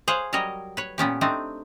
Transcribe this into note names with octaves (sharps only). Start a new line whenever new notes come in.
G#4 C5 C#5 F5 F#5
F#3 G3 A#4 C#5 D#5
B4 C#5
A#2 B3 C#4 G4
A3 C4 D4 D#4